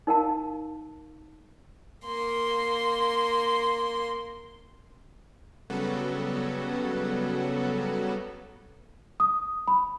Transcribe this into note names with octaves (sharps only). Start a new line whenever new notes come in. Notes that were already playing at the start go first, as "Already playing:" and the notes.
D#4 A#4 F5 A5
A#3 C6
C#3 F#3 G3 B3 F#4 A4
D#6
B5